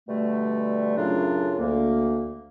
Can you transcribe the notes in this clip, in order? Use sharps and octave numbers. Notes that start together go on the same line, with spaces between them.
B2 D3 G3 A3
F#2 A2 C#3 F#3 D4 F4
D2 A#3